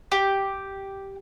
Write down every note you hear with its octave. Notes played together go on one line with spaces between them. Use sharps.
G4